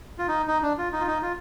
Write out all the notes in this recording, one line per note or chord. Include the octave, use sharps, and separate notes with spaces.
F4
D#4
D#4
D4
F4
D#4
F4
D#4
F4